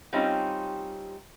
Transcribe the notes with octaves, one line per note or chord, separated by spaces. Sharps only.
G3 C4 C#4 D#4 F4 G4